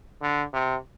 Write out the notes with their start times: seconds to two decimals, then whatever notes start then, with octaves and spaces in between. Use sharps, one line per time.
0.22 D3
0.54 C3